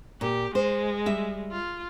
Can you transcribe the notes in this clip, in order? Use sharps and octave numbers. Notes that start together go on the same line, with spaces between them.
A#2 G4
G#3 C5
G3 E5
F4